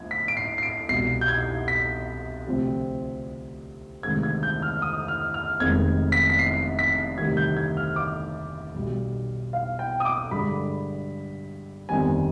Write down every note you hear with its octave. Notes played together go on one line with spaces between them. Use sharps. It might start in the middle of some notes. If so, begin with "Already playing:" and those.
Already playing: D2 D3 F3 G#6
B6
D7
C7
C7
D7
C2 B2 G3 C7
G6
G#6
B6
D2 C3 F3 C4
D2 C3 D#3 G#3 G#6
G#6
G6
F6
D#6
F6
F6
F1 F2 D#3 G#3 B3 G#6
B6
B6
C7
B6
D2 C3 D#3 G3 G#6
G6
G#6
F6
D6
B1 B2 G3 B3
F5
G5
D#6
D6
G2 D3 G#3 B5
G1 F2 D#3 G3 B3 G#5